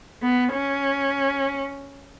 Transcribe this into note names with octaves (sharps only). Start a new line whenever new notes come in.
B3
C#4